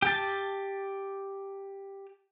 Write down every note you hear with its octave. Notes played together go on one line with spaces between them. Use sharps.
G4 A5